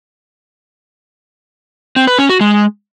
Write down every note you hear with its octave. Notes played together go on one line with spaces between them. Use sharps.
C4
B4
C#4
F#4
G#3